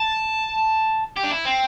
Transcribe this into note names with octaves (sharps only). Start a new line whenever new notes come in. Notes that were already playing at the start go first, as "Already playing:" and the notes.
Already playing: A5
G4
D4
E4
C4